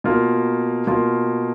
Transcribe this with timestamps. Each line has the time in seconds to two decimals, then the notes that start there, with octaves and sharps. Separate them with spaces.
0.04 B2 A#3 F4
0.87 B2 A#3 F4